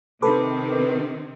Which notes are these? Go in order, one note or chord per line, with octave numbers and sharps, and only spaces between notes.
C3 D#3 C4 A4 B4 D6